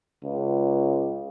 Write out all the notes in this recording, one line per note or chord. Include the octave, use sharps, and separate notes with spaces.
C#2